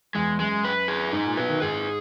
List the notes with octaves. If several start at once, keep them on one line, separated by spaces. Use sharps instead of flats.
E2 G#3
F#2 G#3
B4
G#4
G#2 D#4
A#2
B2 B4
D#3
G#2 G#4